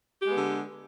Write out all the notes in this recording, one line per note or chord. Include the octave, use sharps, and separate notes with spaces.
D3 G#3 B3 G4